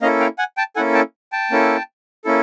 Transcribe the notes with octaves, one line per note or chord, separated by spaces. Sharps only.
A#3 C#4 E4 A4 D#5 F5
F5 G5
F#5 G#5
G5 A5
A#3 C#4 E4 A4 F#5 G#5
G5 A5
G5 A5
A#3 C#4 E4 A4
A#3 C#4 E4 A4